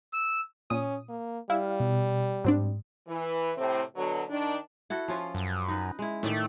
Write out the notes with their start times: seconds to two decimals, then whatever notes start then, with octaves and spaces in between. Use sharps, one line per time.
0.13 E6
0.70 A#2 C#4 D#6
1.09 A#3
1.50 G3 E4 F5
1.80 B2
2.44 G#2 F#3 C4 D4
3.08 E3
3.58 A2 C3 C4
3.96 B2 D3 F#3
4.29 D#3 D4
4.90 E4 F#4 A4
5.08 F3 C#4 F4
5.35 F#2
5.68 D#4 B4
5.99 G#3 E4
6.23 A2 D#3 A3 D5